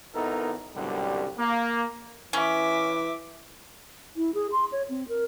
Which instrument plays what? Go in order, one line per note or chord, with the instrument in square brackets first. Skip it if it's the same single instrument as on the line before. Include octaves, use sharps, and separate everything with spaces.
[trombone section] G#1 B3 D#4 E4 A4 A#4
C2 F#2 B2 D3 G3
A#3
[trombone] E3 [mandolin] C#4 [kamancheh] E5 D6
[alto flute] E4
G#4
C6
C#5
C4
A#4